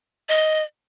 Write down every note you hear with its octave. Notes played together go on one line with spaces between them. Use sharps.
D#5